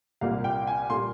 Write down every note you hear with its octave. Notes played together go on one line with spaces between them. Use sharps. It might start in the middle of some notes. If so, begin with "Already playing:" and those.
C2 A#2 G3 A#3 F5
G5
G#5
A#2 G3 A#3 C6